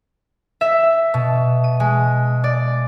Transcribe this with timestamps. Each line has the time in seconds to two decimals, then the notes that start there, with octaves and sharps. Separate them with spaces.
0.61 E5
1.14 B2
1.64 D#7
1.80 G#3
2.44 D5